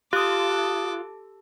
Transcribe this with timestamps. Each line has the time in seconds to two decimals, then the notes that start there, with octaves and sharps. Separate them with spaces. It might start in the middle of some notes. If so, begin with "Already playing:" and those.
0.13 F4 G4 A4 D6 D#6 F#6